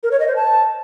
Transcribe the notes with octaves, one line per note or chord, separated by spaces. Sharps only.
A#4
C#5
D#5
C5
A5